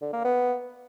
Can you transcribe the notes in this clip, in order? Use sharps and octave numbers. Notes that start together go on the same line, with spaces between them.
D3
A#3
B3